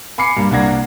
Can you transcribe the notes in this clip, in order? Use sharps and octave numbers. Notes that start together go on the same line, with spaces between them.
G#5 B5 D6 C7 C#7
G2 A#3
C2 A#3 D4 F#5 G#6 A#6